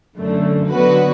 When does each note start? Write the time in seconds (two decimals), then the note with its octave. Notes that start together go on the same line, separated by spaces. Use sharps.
0.17 F#2 D3 A3
0.70 D3 F#3 B3 F#4 B4